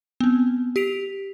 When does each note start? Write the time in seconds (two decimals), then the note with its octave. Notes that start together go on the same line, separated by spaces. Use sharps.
0.20 B3 C4
0.76 G4 B6 D7 F7